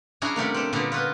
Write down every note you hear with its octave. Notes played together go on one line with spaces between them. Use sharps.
F#3 C#4 D4 E4 F#4 G#4
C3 G3 A3 A#3
C4 C#5
A#2 D3 G3 A#3 B3
F4 F#4 B4